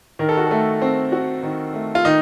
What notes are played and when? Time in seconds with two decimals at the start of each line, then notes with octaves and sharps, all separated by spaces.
0.19 D#3 A#4
0.29 A4
0.37 F#4
0.47 A3 A4
0.82 C4
1.12 F#4
1.43 D#3
1.73 A3
1.95 F4
2.05 D#3 D#4